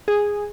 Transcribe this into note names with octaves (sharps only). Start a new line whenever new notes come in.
G#4